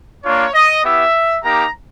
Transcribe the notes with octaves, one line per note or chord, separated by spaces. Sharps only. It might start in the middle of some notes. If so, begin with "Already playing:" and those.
A#3 D4 F4 C#5
D#5
B3 E4 G4 E5
A#3 D#4 G4 A#5